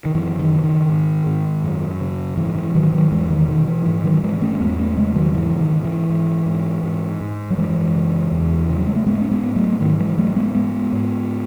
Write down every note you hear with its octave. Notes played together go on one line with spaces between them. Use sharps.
D#3
F#2 E3
D#3
C#3
D#3
G#2
G#2
F#2
C#3
G#2 E3
E3
G#2 D#3 F#3
D#3 F#3
E2 E3 G#3
D#3
B2 D#3
E3
G#2 E3
D#3 F#3
G#2 E3 G#3
A3 C#4
A3
E2 G#3 B3
A3 C#4
C#3 G#3 B3
D#3 F#3
G#2 E3
D#3
G#2
E3
G#2
G#2
G#2
G#2
F#3
F#2 E3 G#3
C#3
E2
C#3
F#3
G#3
A3
G#2 G#3 B3
C#4
G#3 B3
G#2
F#3 A3
G#2 D#3 F#3
E3 G#3
G#2 F#3 A3
G#3 B3
G#2 G#3 B3
G#2